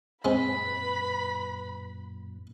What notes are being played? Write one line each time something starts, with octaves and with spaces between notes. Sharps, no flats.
F#2 A#2 G#3 C4 B4 B5